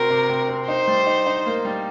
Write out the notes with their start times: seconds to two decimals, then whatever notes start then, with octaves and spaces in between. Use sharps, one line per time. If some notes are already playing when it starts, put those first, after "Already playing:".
Already playing: C3 C4 F#4 A#4
0.10 C3
0.29 C3
0.49 C4
0.68 D#4 C5
0.88 G3
1.07 D#4
1.26 D#4
1.46 A#3
1.65 G3